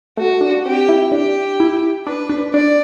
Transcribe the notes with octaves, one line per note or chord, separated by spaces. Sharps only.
A3 F#4
D4
C4 G4
E4
D4 G4
E4
D4 B4
D4
D4 D5